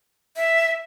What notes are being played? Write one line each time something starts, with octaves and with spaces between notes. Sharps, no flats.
E5